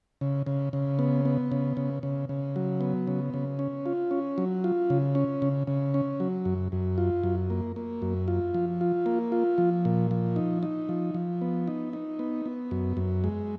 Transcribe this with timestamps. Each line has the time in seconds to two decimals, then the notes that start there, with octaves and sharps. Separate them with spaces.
0.21 C#3
0.46 C#3
0.73 C#3
0.99 B3
1.25 B3
1.52 C#3
1.77 C#3
2.03 C#3
2.29 C#3
2.56 F#3
2.81 B3
3.07 C#3
3.34 C#3
3.59 C#4
3.86 F4
4.11 C#4
4.38 F#3
4.64 F4
4.90 C#3
5.15 C#4
5.42 C#3
5.67 C#3
5.94 C#4
6.20 F#3
6.45 F#2
6.72 F#2
6.98 F4
7.23 F#2
7.50 A#3
7.76 A#3
8.02 F#2
8.28 F4
8.54 F3
8.81 F4
9.06 A#3
9.32 F4
9.58 F3
9.85 A#2
10.11 F3
10.36 D#4
10.63 D#4
10.89 F3
11.14 F3
11.41 B3
11.68 D#4
11.93 D#4
12.19 B3
12.46 B3
12.71 F#2
12.97 F#2
13.24 G#3